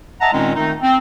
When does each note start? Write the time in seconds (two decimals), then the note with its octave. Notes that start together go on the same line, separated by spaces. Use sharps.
0.21 D#5 E5 F#5 A5 A#5
0.32 A#2 D#3 G#3 C4 C#4 D#4
0.55 D#3 A3 C4 D#4
0.82 C4